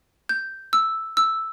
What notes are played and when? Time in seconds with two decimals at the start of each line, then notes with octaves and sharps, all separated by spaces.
0.29 G6
0.73 E6
1.17 E6